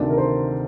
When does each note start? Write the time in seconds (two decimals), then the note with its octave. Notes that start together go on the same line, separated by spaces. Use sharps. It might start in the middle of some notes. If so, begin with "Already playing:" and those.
Already playing: D2 C3 D#3 A3 D5
0.10 A#4
0.18 C5